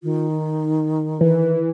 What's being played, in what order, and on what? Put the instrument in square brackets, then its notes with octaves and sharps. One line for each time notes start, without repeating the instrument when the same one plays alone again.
[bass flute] D#3 [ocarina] F4
[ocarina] D#4
[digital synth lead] E3 [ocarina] B4